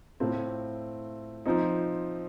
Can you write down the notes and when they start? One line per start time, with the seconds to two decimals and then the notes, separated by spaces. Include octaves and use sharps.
0.20 A2 A3 C4 F4
1.46 F3 C4 D#4